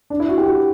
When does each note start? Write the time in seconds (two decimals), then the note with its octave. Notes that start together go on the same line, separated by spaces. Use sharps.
0.10 D4
0.20 E4
0.29 F#4
0.38 G4
0.46 F#4